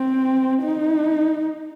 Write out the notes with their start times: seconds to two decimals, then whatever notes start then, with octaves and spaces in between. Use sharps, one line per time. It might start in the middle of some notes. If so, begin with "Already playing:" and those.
Already playing: C4
0.62 D#4